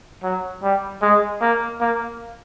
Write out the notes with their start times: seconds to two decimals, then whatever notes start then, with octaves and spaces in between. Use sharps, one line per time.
0.23 F#3
0.63 G3
1.02 G#3
1.41 A#3
1.80 A#3